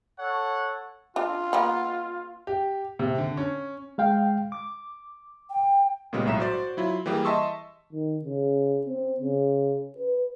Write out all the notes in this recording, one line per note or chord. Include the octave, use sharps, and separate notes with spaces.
A4 C#5 F#5
D4 F4
A#3 B3 F#5
G4
C3
D3
C#4
G#3 F5 G5
D6
G5
A#2 C#3 G3 G#3 B3
B1 A2 E5 A#5 E7
F#4 C5 D5
F#3 E4 F4
E3 G3 A#3 G4 G#4
D#5 E5 A5 C6 C#6 E6
D#3
C#3
C4
C#3
B4